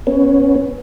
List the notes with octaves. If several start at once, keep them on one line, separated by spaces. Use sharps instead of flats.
B3 C#4